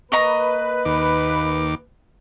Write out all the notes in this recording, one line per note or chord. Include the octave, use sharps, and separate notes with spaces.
A#3 B4 D#5 A#5 C#6
D#2 D6